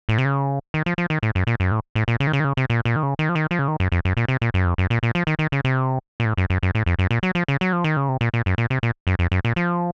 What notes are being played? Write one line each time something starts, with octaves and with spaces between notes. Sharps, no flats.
A2
C3
C#3
D#3
F3
F3
D#3
A2
F#2
A#2
F#2
A2
A2
A#2
C#3
D#3
C#3
D#3
C#3
C3
A#2
A#2
D#3
C#3
D#3
F3
D#3
F3
C#3
D#3
F#2
F2
F#2
A#2
C3
A#2
F#2
F2
F#2
A#2
A#2
F3
D#3
D#3
C#3
C3
A#2
A2
F#2
F#2
F#2
A2
F2
F#2
A#2
F#3
F3
C#3
F#3
F3
D#3
C#3
C3
A#2
A#2
F#2
A#2
C3
A#2
F#2
F2
F#2
A#2
F3